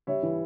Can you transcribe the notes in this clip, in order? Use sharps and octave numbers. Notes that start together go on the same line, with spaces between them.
G3 C#5 E5
E3